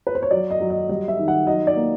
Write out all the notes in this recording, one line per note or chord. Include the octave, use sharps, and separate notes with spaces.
B4
C5
C#5
F#3 D5
D#5
F#3
D#5
G3 D#5
E5
D#3
F#5
F#3 D#5
D5
A#3